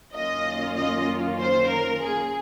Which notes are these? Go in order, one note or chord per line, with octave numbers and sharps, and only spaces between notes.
F#2 D#3 A#3 C#4 F4 D#5
D#5
C5
A#4
G#4